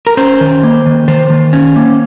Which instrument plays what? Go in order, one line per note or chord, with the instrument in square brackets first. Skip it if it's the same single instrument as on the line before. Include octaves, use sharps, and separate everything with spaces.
[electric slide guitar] A#4
C#4 C5
D#3
A#3
D#3
D#3 C5
D#3
C#4
A#3